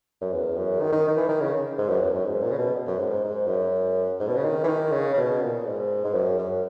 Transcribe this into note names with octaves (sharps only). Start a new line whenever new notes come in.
F#2
E2
F#2
D#3
D#3
D#3
E3
D#3
C#3
G#2
F#2
E2
F#2
G#2
A#2
C#3
B2
F#2
G#2
G#2
G#2
F#2
G#2
B2
C#3
D#3
E3
D#3
C#3
C#3
B2
A#2
G#2
G#2
F#2
F#2